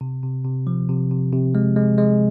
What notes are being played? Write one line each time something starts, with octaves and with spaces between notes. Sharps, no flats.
C3
C3
C3
F3
C3
C3
C3
G#3
G#3
G#3